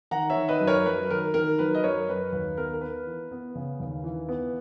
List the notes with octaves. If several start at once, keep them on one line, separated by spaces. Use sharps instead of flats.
D#3 F#5 A#5
C#5 E5
D#3
B4 D#5
F#2
A#4 C#5
F#3 B4
D#3 A#4
D#3 A#4
F#3 B4
D#5
F#2 A#4 C#5
F#2 B4
D#2 B4
B3 A#4
A#4
B3 B4
E3
B3
C#3
D#2
E3
B3